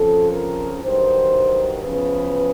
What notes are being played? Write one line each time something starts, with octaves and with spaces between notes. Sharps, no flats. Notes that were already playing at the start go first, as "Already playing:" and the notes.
Already playing: F2 C#3 F3 A4
A#4
G2 D#3 F#3 C5
E2 C#3 F3 B4